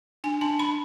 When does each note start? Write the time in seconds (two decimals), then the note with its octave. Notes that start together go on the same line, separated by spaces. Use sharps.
0.24 D4 G#5
0.41 D4 A5
0.59 D4 B5